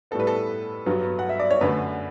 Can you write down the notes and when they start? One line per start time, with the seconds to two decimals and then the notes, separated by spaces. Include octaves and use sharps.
0.11 A2 G3 B3 A4
0.20 B4
0.27 A4
0.86 G2 F#3 B3
1.19 F#5
1.29 E5
1.40 D5
1.51 C#5
1.61 F#2 D3 A3 B4